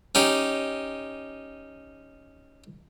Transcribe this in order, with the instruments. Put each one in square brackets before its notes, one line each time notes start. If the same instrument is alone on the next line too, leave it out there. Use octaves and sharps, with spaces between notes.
[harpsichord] C#4 D#4 G4